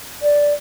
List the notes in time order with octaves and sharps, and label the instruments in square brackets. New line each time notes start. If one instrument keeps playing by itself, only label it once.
[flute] D5